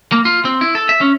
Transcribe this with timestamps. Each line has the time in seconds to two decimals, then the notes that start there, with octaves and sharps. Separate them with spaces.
0.12 A#3
0.25 F4
0.45 C4
0.61 E4
0.75 A4
0.89 E5
1.01 C#4